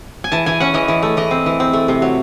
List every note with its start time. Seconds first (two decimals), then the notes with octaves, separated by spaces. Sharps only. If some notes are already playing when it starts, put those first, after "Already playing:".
0.24 G#5
0.32 E3 A5
0.46 E3 G#5
0.60 C#4 F#5
0.74 E3 D#5
0.88 E3
1.02 A3
1.17 E3 D#5
1.31 C4
1.46 E3
1.60 C4
1.73 A3
1.88 C3
2.02 F#3